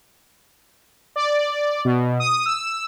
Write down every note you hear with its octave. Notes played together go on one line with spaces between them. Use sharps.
D5
B2
D#6
E6